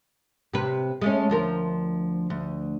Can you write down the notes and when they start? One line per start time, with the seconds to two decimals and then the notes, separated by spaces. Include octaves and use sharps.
0.53 C3 B4
1.02 G#3 A3 C#4
1.30 D2 F3 A#4
2.30 D2